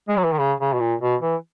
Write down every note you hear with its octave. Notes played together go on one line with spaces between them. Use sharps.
G#3
F#3
E3
D#3
C#3
C#3
B2
A#2
B2
E3